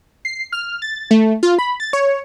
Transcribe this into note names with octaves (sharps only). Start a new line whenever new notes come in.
C7
F6
A6
A3
F4
B5
A6
C#5